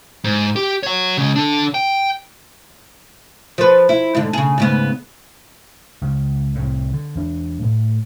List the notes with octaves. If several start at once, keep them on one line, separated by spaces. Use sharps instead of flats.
G#2
G4
C#5 F#5
C#3 G#3
D4 A4
G5
F3 B4
E4
G#2 D3
C#3 G#4
G#2 C#3 B3
C#2 C#3
C2 A2
D3
E2 D4
A2